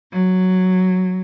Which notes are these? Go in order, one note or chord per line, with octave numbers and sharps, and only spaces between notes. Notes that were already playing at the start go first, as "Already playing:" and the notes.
F#3